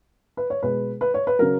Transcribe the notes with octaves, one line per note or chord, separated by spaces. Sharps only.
B4
C#5
B2 G#3 B4
B4
C#5
B4
C#3 F#3 A#4